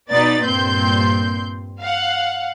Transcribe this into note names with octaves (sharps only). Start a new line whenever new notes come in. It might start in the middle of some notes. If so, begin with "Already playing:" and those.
B2 B3 D#4 B4 D5 A6
G2 A#2 C4 C6 G6
F5 F#5